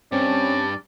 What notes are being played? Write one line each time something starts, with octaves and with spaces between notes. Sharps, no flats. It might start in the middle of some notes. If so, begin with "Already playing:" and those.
G2 C4 C#4 D5